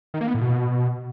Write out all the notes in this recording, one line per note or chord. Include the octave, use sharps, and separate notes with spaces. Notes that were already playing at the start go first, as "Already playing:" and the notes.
D#3
A#3
B3
A2
B2